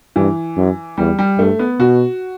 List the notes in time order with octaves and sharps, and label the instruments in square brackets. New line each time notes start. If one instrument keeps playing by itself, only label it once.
[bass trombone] G2 [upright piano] E3
[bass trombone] F#2
[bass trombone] E2 [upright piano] G3
[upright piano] G3
[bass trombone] G2 [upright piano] A3
[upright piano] B3
[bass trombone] B2 [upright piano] F#4